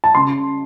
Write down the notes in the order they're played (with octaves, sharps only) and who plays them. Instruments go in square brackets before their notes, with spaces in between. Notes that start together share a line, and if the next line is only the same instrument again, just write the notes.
[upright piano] A5
C#3 C6